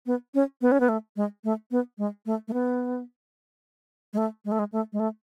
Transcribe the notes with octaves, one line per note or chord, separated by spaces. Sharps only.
B3
C#4
B3
C#4
B3
A3
G#3
A3
B3
G#3
A3
A3
B3
G#3
A3
G#3
A3
G#3
A3
G#3
A3